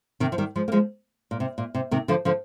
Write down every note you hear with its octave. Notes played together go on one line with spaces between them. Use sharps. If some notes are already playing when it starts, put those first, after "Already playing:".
C3 D#3
F3
D#3 G3
F3 G#3
A#3
F3 G#3
A#2
C3
A#2
C3
C3 D#3
D3 F3
D3 F3